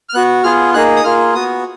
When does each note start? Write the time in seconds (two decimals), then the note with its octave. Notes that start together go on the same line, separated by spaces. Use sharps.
0.09 F6
0.14 B3 F#4 F#6
0.44 B3 F4 G#4 F6
0.74 A#3 D#4 G#4 F#6
0.96 D#6
1.04 A#3 F4 G#4 F6
1.34 B3 F#4 D#6